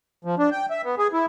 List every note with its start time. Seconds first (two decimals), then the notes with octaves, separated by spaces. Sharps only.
0.25 F3
0.39 D4
0.51 G5
0.70 E5
0.84 B3
0.98 G#4
1.13 E4